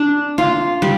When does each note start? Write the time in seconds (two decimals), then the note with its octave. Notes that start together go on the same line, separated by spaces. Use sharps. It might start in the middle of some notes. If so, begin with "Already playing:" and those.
Already playing: D4
0.38 F4
0.82 G3